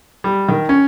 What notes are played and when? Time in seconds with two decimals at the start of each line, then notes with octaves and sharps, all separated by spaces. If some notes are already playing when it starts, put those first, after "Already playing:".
0.24 G3
0.49 D#3
0.69 C#4